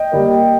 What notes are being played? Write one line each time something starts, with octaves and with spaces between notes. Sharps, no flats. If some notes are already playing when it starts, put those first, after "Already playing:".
Already playing: D#5 G5
G3 A#3